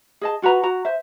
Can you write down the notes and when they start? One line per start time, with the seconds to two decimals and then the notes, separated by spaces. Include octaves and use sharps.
0.21 G#4 D#5 A5
0.42 F4 F#4 B4 A#5
0.63 F#4 A#5
0.85 C5 E5